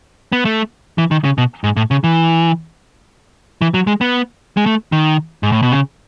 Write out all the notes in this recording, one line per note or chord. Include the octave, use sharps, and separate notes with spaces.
B3
A3
E3
D#3
C#3
B2
G#2
A2
C#3
E3
E3
F#3
G#3
B3
G#3
A3
D#3
G#2
A2
B2
C#3